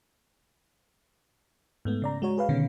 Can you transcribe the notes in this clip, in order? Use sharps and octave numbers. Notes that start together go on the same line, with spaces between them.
G#2 A3 B3
C#3 D5 A#5
G#3 F#4 C#5
G#4 B4 F5
B2 D3 D#3 C#4